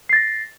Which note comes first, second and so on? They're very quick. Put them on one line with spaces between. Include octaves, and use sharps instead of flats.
C7 A6 A#6